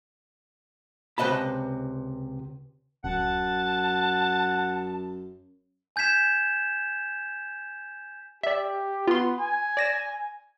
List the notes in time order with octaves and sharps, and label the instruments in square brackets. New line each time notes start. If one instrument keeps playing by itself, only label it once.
[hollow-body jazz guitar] C#2 C3 B4 D#5 A5 B5
[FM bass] D1 [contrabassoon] F#2 [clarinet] F#5 [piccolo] A5
[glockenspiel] G#5 G6 G#6 B6 E7
[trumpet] G4 [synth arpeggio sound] D5 E5
[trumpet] B3 [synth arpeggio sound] F4 C6
[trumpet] G#5
[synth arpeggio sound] D5 A#6 E7